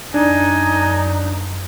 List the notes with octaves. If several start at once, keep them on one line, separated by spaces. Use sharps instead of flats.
F#2 D4 D#4 G#5